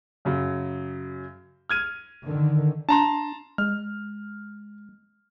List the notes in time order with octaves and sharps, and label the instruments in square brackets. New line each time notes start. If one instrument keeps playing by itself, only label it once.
[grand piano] F#2 C#3 F#3
F6 G#6 D#7
[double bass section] D3 D#3
[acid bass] D4 [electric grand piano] A5 A#5 C6
[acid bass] G#3 [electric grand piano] F6